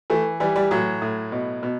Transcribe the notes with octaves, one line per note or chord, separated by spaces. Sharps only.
E3 A3
E3 G3
G3
A2 F#3
A2
B2
B2